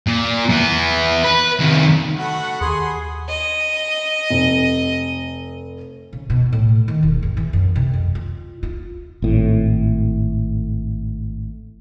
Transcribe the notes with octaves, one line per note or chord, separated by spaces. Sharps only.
A#2
E3 B3
B4
C2 D#3
A3 F#4 F#5 B5
D#2 G#4 B5 C6
D#5
F1
C#3
B2
A2
D#3
E1
G#1
E3
F#2
C3
F2
F4
F4
G#1 A2